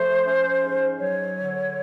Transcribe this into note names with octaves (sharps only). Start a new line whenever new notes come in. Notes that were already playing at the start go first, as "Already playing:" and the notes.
Already playing: F3 A3 C5
C#4
G#2
F#3 C#5
D3